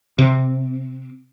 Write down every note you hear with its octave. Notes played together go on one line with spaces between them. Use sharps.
C3